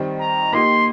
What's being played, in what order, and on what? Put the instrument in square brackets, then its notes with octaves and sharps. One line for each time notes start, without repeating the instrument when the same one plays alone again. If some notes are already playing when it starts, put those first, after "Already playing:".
Already playing: [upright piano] D#3 G3 C4
[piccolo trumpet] A#5
[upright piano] A#3 D#4 G4 [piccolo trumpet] C6